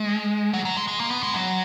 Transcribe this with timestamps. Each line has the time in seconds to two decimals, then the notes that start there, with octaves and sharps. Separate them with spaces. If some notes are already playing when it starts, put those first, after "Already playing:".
Already playing: G#3
0.53 F#3
0.65 F#3
0.77 G#3
0.88 G#3
1.00 A#3
1.11 B3
1.23 G#3
1.34 F#3